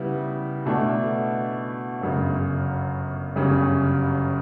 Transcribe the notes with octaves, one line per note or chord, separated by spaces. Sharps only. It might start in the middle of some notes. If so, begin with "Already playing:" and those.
Already playing: C#3 G3 B3 E4
B2 A3 D4
G1 F#2 C#3
G1 F#2 C#3 G3 C#4